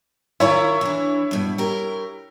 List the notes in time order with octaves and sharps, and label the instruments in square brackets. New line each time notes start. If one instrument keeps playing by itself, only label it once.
[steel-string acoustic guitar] D#3 F4 A#4 [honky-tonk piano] E4 C#5
[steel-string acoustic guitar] E3 D4
G2 B2
G4 A#4